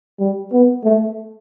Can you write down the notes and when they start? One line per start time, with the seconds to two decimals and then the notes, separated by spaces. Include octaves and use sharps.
0.19 G3
0.52 B3
0.84 A3